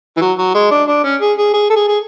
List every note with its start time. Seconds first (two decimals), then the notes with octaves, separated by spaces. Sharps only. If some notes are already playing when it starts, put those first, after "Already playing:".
0.17 E3
0.21 F#3
0.38 F#3
0.55 G#3
0.71 D4
0.88 D4
1.04 C#4
1.21 G#4
1.38 G#4
1.54 G#4
1.70 A4
1.76 G#4
1.88 G#4